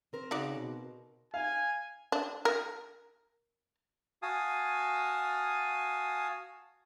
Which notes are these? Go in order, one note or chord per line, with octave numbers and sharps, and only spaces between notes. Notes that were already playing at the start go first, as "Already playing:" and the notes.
C4 A#4 C5
C#3 D#4 F#4 D5
B2
F5 G#5
D4
A#4
F#4 F5 G#5 A5 D#6